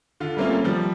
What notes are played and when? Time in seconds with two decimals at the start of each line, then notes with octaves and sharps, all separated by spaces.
0.20 D3 F4
0.37 G3 A3 A#3 C4 C#4 F4
0.65 F3 G3